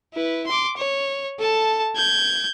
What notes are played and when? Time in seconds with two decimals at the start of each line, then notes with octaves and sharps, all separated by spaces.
0.14 E4 B4
0.47 C6 D6
0.77 C#5
1.39 A4 A5
1.96 G6 G#6